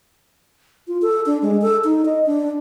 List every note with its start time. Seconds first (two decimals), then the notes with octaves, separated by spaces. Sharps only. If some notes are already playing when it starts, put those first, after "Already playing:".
0.88 F4
1.02 A4
1.26 D4
1.42 G#3
1.62 A4
1.84 D#4
2.05 D#5
2.26 D4